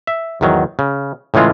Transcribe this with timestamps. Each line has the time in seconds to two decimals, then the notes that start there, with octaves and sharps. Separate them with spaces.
0.07 E5
0.41 E2 G#2 D#3 F#3
0.79 C#3
1.34 A2 C#3 E3 G#3 F4